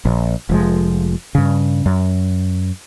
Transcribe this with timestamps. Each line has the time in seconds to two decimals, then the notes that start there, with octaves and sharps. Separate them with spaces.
0.05 A#1
0.49 F1 F3 G#3
1.35 G2 C#3
1.86 F#2